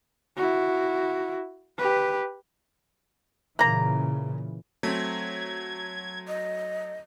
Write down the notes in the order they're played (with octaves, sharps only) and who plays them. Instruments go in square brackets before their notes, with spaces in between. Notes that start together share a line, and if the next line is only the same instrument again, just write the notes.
[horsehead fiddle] E4 F#4
G4 B4
[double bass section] A#2 C#3 E3 [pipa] A#3 A#5
[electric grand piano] F#3 [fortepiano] A3 C4 [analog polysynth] G#6
[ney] D#5